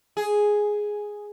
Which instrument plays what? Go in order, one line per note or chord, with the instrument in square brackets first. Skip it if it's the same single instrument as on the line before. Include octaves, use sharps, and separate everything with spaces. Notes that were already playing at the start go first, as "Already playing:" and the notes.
[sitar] G#4